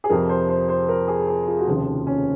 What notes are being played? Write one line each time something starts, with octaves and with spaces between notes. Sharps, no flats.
G#4
F2 C3 F3 A#4
C5
C5
C5
A#4
G#4
G#4
F4
F#4
F1 D#2 C#3 F3 F4
C#4